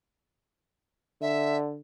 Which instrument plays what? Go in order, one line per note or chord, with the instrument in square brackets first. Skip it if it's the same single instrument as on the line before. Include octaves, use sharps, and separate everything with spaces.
[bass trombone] D3 [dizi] E5